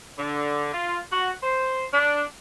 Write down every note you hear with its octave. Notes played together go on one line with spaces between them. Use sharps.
D3
F4
F#4
C5
D4